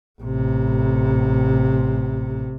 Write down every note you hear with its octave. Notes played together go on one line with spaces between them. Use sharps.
A1 C3